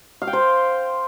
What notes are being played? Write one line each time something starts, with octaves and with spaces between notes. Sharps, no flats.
F5
G5
C5